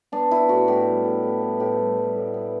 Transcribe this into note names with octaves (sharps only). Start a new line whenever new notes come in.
B3 D4
B3 E4
A2 F#4
A2 G4
G3
A2
A2
B3
A2 G4
G3
G3
A2
B3